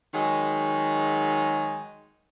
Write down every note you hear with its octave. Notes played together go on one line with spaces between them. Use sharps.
D#3 F#3 G#3 G#4